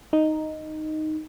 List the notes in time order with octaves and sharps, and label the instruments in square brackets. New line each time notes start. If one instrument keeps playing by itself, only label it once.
[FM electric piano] D#4